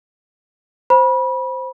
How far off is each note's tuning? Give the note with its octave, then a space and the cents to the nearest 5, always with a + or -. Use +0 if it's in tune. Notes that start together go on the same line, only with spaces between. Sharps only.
C5 +0 B5 -25